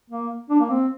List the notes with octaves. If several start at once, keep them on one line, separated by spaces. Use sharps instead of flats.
A#3
D4
A#3
C4